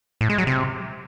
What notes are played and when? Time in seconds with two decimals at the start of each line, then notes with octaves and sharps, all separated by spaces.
0.21 A2
0.29 G#3
0.38 F#3
0.47 C3